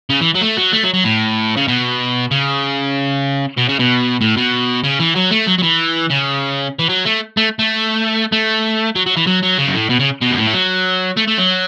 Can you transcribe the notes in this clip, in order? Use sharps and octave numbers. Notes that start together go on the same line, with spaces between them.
C#3
E3
F#3
A3
F#3
A3
F#3
F#3
A2
C#3
B2
C#3
B2
C#3
B2
A2
B2
C#3
E3
F#3
A3
F#3
F#3
E3
C#3
E3
F#3
A3
A3
A3
A3
F#3
F#3
E3
F#3
F#3
C#3
F#2
A2
B2
C#3
B2
F#2
A2
A3
F#3
A3
A3
F#3